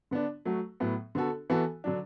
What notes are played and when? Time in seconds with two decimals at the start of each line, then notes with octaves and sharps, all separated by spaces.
0.11 D3 B3 D4
0.45 F#3 A3 F#4
0.80 A2 F#3 B3
1.15 D3 B3 F#4 A4
1.50 E3 B3 F#4 A4
1.84 D3 F#3 D4